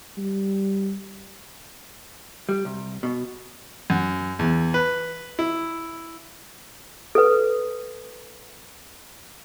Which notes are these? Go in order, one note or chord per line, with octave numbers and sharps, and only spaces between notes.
G3
G3
C2
B2
F#2
E2
B4
E4
A4 B4